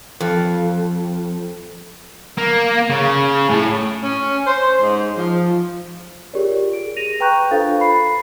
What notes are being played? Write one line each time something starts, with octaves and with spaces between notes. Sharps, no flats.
F2
A#3
C#3
A2
C#4
C5
G#2
F3
F4 G4 G#4 A#4 C#5 D5
G#4 D7
A#6 D#7 F7
B4 G5 A#5 C#6 F#6 G6
D4 F4 A4 C5 F5 A6
B5 C7